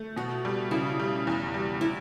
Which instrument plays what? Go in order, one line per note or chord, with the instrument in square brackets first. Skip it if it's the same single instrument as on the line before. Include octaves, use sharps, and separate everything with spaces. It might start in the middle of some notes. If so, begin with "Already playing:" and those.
Already playing: [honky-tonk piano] A3
[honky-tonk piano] B2 [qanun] F#4
[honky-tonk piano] G3
[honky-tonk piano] C#3 [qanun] E4
[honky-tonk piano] G3
E2
G3
[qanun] E4